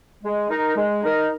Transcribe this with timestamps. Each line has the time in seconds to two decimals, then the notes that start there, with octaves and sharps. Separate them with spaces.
0.24 G#3
0.49 D#4 A#4
0.76 G#3
1.03 D#4 A#4